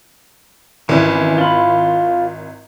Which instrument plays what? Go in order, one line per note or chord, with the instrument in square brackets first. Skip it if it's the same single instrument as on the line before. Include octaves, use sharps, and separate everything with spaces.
[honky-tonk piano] G#1 E4 [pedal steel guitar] E3 C#4
[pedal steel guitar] F4 B5